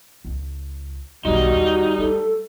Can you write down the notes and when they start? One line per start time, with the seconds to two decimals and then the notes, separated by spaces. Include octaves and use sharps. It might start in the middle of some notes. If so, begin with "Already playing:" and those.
0.25 C#2
1.25 B1 D#3 G3 D#4 F#4
1.51 D#2
1.98 A3 A4